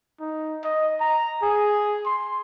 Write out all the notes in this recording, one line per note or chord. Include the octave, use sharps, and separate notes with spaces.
D#4
D#5
A#5
G#4
C6